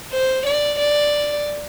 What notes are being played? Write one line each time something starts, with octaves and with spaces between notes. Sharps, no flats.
C5
D5
D5